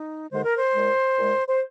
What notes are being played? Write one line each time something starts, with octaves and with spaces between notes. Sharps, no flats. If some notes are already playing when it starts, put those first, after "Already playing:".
Already playing: D#4
D#2 D3 G#3 C5
A#4
C5
A#2 G#3
A#2 G#3
C5